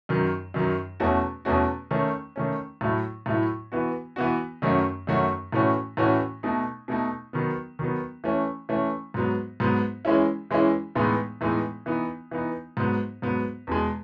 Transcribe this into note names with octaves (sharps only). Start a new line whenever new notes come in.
F#2 D#3 F#3
F#2 D#3 F#3
E2 B2 A3 C#4 F#4
E2 B2 A3 C#4 F#4
D#3 A3 C#4
D#3 A3 C#4
A2 F#3 A3 E4
A2 F#3 A3 E4
E3 B3 F#4
E3 B3 F#4
F#2 D#3 A3 C#4 F#4
F#2 D#3 A3 C#4 F#4
A2 E3 A3 C#4 F#4
A2 E3 A3 C#4 F#4
B2 A3 D#4
B2 A3 D#4
D#3 F#3 B3
D#3 F#3 B3
E3 A3 C#4
E3 A3 C#4
G#2 F#3 B3
G#2 F#3 B3
E3 G#3 C#4 E4
E3 G#3 C#4 E4
A2 E3 G#3 B3 D#4
A2 E3 G#3 B3 D#4
E3 B3 D#4
E3 B3 D#4
G#2 F#3 B3
G#2 F#3 B3
E2 B2 G#3